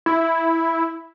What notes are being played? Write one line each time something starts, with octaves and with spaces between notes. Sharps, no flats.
E4